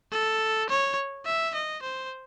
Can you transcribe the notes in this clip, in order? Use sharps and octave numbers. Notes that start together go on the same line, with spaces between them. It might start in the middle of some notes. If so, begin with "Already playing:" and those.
A4
C#5
E5
D#5
C5